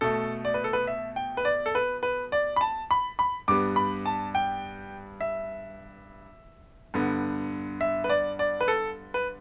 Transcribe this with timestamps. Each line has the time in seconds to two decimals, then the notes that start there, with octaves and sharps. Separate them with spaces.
0.01 B2 A3 A4
0.45 D5
0.54 B4
0.64 A4
0.73 B4
0.87 E5
1.16 G5
1.37 B4
1.45 D5
1.66 A4
1.75 B4
2.03 B4
2.32 D5
2.56 B5
2.61 A5
2.91 B5
3.19 B5
3.48 G2 G3 B3 D6
3.76 B5
4.06 A5
4.35 G5
5.21 E5
6.94 G2 D3 B3
7.81 E5
8.04 B4
8.10 D5
8.39 D5
8.61 B4
8.68 A4
9.14 B4